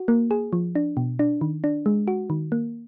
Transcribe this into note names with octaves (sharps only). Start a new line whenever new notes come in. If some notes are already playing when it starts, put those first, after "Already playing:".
Already playing: F#4
A#3
G#4
F3
D4
B2
D4
D#3
D4
G#3
F#4
D#3
A#3